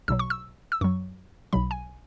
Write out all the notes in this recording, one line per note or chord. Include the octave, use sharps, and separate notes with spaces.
B1 B2 F#3 E6
C#6
E6
E6
F#2 F#3 C#6
B1 B2 F#3 B5
G#5